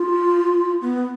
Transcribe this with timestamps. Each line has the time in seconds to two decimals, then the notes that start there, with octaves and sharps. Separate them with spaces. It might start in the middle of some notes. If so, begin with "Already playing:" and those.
Already playing: F4
0.82 B3